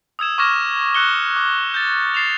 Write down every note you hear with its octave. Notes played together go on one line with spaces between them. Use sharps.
D#6 E6 G#6 E7
C#6 D6 F6 G#6 A#6 E7
F#6 C#7 G7
D6
G6 A6
A6 C7 E7 F7